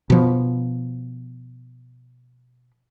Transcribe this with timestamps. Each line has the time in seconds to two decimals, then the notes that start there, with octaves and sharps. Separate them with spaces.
0.10 B2 F3